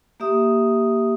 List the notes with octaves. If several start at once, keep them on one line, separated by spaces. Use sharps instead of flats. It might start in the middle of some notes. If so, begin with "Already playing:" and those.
A#3 G4 E5 D#6